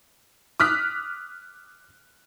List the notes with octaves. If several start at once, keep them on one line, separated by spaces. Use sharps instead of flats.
D6 D#6 F6 F#6 B6